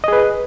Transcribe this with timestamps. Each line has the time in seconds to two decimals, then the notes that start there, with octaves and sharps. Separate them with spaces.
0.04 D#5
0.08 G#4
0.13 B4